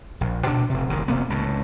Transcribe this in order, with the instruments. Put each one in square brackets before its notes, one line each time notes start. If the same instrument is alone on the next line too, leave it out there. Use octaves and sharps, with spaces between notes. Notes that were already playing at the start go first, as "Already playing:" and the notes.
[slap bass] A#1
D2 B2 D4
F1 C3
F#1 D2 D#3
F1 C3 A#3 B3
C#2 A2